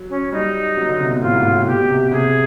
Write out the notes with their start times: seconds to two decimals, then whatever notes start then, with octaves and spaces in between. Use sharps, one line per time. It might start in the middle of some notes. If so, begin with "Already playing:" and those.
Already playing: F#3
0.09 C#4
0.32 G3 D#4
0.77 F#3
0.89 D3
1.00 C3
1.10 B2
1.22 A2 F4
1.33 G#2
1.44 A2
1.56 A2
1.67 B2 G4
1.89 C3
2.12 C3 G#4